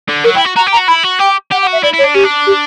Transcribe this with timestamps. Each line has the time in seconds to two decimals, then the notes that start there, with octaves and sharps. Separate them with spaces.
0.09 D3
0.24 F#3 A#4
0.35 E4 G5
0.45 F#4
0.56 F#4 A#5
0.67 G4
0.73 A#5
0.77 F#4
0.88 E4 B5
1.04 F#4
1.19 G4 G5
1.51 G4 F#5
1.62 F#5
1.67 F#4
1.73 E5
1.83 E4 D5
1.93 E4
1.99 C#5
2.04 D4
2.14 C#4 G4
2.24 D4
2.47 G4